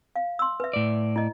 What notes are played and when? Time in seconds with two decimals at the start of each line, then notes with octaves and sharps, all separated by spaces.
0.16 F5
0.39 C6 E6
0.60 B4 E5
0.73 A2 D5
1.16 E4 D#5